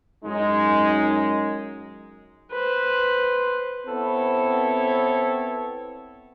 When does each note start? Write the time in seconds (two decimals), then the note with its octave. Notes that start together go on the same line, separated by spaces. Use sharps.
0.25 F#2 G#3 D#4
2.52 B4 C5
3.88 B3 C4 E4 A4 C#5